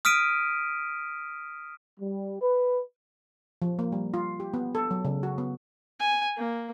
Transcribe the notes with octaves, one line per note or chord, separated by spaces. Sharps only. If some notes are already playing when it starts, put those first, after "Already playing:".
D#6 F6 B6 D7 D#7
G3
B4
F3
A#3
G3
F4
G4
B3
A4
F#3
C#3
F#4
B3
G#5
A#3